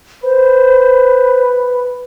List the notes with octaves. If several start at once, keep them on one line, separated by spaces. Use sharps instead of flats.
B4 C5